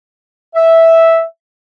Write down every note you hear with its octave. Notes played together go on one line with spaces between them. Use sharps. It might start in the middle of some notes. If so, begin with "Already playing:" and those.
E5